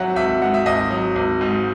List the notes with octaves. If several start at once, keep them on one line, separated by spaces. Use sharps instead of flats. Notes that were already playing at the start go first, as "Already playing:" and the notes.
Already playing: G#1 F#3 E5 F#5
G#1 E5
G#2 F#5
E5
G#1 D#5
F#3
G#1
G#2